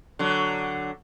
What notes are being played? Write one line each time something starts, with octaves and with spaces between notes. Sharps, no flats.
D3 F#3